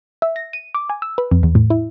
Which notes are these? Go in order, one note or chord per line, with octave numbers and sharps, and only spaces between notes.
E5
A#6
D#7
D6
G#5
E6
B4
F2
E2
A2
E4